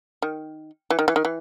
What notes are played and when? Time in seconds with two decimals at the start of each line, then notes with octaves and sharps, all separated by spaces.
0.22 D#3
0.90 E3
0.99 D#3
1.08 E3
1.16 D#3
1.25 E3